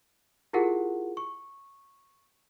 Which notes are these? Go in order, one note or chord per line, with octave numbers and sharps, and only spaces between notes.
E4 F4 G4 G#4 A#4 F#5
C#6